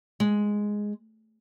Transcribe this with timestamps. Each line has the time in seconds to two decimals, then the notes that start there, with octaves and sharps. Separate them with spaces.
0.20 G#3